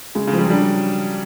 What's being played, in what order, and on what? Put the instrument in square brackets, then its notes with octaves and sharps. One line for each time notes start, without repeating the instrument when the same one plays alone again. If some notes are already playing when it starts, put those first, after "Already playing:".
[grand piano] C#3 [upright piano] G#3
[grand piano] C#3
[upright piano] F3 [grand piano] G3
[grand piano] F#3
[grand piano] G3 [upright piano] D4